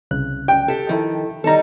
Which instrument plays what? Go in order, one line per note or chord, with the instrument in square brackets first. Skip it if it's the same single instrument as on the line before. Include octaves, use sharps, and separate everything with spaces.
[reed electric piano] C2 C#3 F#6
[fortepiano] G5
[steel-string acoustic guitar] G4 A4
[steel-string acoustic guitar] D#3 [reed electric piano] F3 E4 A4
[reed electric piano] D#3 A#5 [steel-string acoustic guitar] G3 D#4 A4